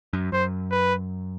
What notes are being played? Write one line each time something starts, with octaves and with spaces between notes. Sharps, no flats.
F#2
F#2 C5
B4